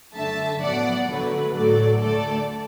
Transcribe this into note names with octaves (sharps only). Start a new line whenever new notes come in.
F#2 D3 A3 E5 A5
A2 F#3 B3 D5 F#5
D2 D3 F#3 A3 B4
A2 F#3 A3 A4 D5
D2 D3 A3 A4 D5